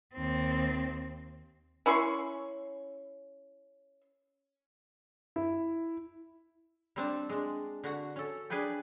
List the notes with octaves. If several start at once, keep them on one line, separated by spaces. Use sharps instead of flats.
D#2 C4
C#4 E4 C6 C#6
E4
G3 C4 D4
G#3 D4
D3 F#4 F#5
C#4 A4
D4 G#4 B4 D5 G5